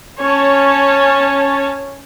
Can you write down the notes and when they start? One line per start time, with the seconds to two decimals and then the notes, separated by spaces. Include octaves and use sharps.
0.21 C#4 C#5 A5